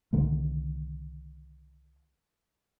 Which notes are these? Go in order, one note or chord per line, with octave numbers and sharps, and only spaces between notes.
C2 D3 D#3 A3